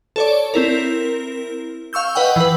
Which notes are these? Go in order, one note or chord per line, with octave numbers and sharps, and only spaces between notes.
A4 C#5 D5
C4 E4 A#4
F5 C#6 E6 G6
B4 D#5 F#5 G5
E3 B4